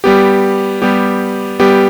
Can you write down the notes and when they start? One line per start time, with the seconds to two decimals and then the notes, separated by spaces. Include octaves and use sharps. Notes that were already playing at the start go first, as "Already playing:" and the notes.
0.04 G3 B3 G4
0.82 G3 B3 G4
1.60 G3 B3 G4